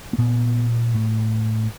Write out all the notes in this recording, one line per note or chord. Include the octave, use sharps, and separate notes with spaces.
A#3
A#2 B3
A2